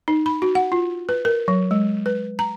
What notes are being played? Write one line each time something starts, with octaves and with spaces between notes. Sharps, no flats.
D#4
B5
F#4
F#5
F4
B4
A#4
F#3
G#3
B4
A#5